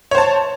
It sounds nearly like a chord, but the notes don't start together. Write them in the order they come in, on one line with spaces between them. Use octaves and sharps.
C#5 C5 A5